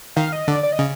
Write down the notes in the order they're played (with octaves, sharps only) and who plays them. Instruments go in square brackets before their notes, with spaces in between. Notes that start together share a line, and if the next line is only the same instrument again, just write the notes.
[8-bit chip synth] D#3 [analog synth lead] F5
[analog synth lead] D#5
[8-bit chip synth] D3 [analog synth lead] D5
[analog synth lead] D5
D#5
[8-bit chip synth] C#3